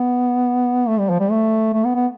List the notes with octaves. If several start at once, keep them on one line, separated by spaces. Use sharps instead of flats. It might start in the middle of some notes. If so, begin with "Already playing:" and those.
Already playing: B3
A3
G3
F3
G3
A3
A3
B3
B3